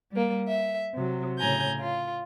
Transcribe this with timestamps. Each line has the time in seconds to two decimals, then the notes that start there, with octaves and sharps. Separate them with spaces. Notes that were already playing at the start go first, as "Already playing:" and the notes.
0.12 G3 A#3
0.48 E5
0.94 C3 F#3
1.38 A2 C#3 G#5 A#5 G6
1.80 F4